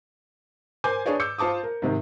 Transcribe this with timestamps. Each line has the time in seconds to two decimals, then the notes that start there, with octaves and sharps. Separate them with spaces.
0.84 A#4 C5 G#5 D6 G6
1.06 D4 G#4 B4 C#5 D5
1.20 D6 E6 G6 C#7
1.38 F4 C5 A5 D6 D#6
1.63 A#4
1.82 G#2 C3 D#3